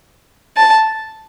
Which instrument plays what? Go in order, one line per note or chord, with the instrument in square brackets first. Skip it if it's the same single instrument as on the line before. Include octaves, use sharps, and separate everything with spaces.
[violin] A5